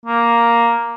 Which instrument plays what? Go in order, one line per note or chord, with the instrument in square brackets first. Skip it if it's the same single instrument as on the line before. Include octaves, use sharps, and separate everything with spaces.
[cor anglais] A#3